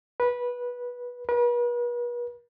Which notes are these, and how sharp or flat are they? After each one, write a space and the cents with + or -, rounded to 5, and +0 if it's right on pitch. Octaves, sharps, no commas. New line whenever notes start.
B4 -15
B4 -40